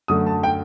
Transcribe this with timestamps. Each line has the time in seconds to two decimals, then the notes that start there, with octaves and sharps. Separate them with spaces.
0.08 F#2 D3 A3 D#6
0.27 A5
0.43 G5